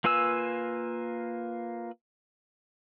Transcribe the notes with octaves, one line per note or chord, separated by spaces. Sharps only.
A#3 F4 B4 G#5 E6